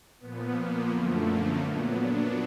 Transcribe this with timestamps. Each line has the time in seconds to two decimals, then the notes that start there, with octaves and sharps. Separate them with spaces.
0.19 A#2 F3 B3
0.55 A#3
0.89 F#2 D3 F3 A3
1.25 A#3
1.59 A#2 F#3 B3
1.95 D4